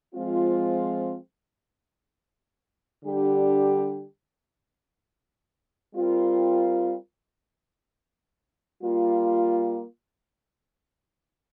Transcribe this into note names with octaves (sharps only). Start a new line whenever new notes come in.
F3 G#3 C4 F4
D3 G3 D4 G4
G3 C4 F4 A#4
G3 A#3 F4